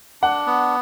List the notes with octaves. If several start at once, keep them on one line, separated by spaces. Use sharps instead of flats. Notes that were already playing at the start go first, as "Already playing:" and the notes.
D4 F#5
B3